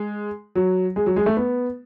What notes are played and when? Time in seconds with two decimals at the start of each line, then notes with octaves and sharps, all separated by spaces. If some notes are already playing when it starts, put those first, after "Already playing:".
Already playing: G#3
0.55 F#3
0.96 G#3
1.06 F#3
1.16 G#3
1.26 A3
1.37 B3